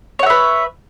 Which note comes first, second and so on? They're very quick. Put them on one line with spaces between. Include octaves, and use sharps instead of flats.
C#5 F#5 E5 B4